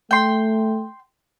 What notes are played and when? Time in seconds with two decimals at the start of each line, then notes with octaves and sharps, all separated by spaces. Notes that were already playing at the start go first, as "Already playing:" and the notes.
0.11 A3 G5 C6